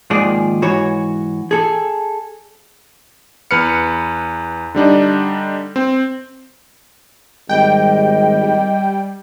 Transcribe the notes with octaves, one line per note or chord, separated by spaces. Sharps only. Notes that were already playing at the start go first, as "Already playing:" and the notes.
D#2 G#2 D#3 F3 G#4 D5
G#2 E3 F#4 C#5
G#4 A4
E2 B4 F6 C#7
D3 G3 D4 D#4
C4
G#1 G3 D#5 G5